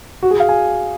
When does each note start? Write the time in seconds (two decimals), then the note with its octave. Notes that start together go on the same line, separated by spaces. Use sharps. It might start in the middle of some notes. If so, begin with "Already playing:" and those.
0.23 F#4
0.31 G#4
0.40 F5
0.49 G#5